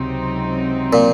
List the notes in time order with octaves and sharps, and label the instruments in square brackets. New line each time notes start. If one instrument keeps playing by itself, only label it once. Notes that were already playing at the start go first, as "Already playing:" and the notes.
Already playing: [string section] C#2 C3 F#3 C4 D#4
[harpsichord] A#2